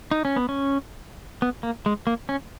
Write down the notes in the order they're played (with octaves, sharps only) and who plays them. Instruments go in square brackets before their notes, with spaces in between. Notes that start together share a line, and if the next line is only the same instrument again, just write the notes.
[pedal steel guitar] D#4
C#4
B3
C#4
B3
A#3
G#3
A#3
C#4